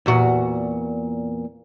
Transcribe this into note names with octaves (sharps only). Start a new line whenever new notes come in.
E2 A#2 F#4